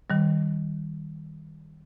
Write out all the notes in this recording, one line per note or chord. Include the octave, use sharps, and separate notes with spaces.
D#3 G3